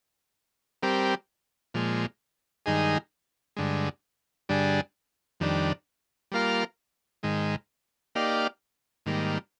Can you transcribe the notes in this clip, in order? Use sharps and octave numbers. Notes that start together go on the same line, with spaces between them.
G3 C4 G4 A#4
A#2 F3 G#3
G2 D#3 G#3 D#4 G#4
G2 D3 G#3
G2 D3 G3 D4 G#4
F2 D#3 G3 D4
G3 A#3 F4 A#4 F5
G#2 D#3 G#3
A#3 D#4 G4 D5 F5
G#2 D#3 G3 A#3